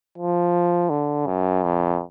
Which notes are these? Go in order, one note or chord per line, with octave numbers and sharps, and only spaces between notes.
F3
D3
F#2
F2